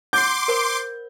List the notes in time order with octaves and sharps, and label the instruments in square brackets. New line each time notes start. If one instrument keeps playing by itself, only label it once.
[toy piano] F#5 [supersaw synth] C6 D6 [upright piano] G6
[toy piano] A#4 C5 B5